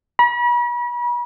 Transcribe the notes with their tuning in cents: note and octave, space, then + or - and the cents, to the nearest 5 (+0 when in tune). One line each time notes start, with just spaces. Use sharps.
B5 -45